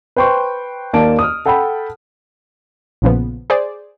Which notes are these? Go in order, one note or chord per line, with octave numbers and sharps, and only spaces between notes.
B4 C5 G5 C6 C#6
D#2 A#3 D5 A5 D7
D#6 F6
A4 F#5 G5 A5 B5
A#1 A#2 C#3 F3 B3
G#4 C5 D5